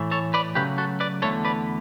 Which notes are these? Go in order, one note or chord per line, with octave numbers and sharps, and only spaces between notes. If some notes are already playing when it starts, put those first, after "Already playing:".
Already playing: A2 E3 A3
A4 C#5
B4 D5
C#3 F#3 A3 G4 B4
F#4 A4
B4 D5
E2 D3 A3 A4 C#5
B4 D5